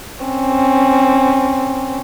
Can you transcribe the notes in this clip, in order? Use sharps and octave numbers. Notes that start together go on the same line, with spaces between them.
C4 C#4